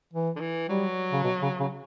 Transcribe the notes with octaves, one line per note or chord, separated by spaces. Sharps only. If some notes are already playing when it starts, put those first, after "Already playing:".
E3
D3
E3
F#3 G3
C#3
B2
C#3
C#3